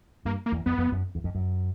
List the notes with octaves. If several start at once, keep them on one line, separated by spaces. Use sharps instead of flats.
G2 A#3
A#3
E2
F2 B3
F2
F#2
E2
F2
F#2